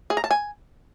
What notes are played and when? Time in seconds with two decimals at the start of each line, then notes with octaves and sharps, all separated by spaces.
0.10 G#4
0.17 A#5
0.24 A5
0.31 G#5